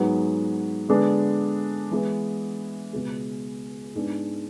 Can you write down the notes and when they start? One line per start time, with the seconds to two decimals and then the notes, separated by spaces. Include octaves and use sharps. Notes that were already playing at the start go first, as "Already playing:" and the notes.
Already playing: G#2 F#3 B3 F#4
0.89 D3 G#3 B3 D4
1.91 E3 G#3 B3
2.93 C#2 B2 G#3
3.95 G#2 G#3 B3 D4